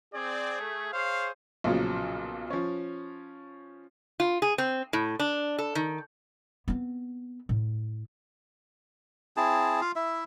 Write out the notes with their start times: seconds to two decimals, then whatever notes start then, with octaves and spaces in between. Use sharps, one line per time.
0.14 C4 G#4 D5
0.60 A3
0.93 G#4 C5 C#5 F5
1.64 B1 A#2 C#3 F3 F#3
2.50 F3 C#4
4.20 F4
4.42 G#4
4.58 C4
4.93 A2
5.20 D4
5.59 A4
5.75 D#3
6.68 B3 C4
7.49 A2
9.37 C4 E4 G#4 A5
9.81 F4 F5
9.96 E4 E5